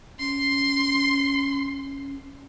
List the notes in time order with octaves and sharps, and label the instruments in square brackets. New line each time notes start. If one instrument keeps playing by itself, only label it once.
[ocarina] C#4 [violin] C6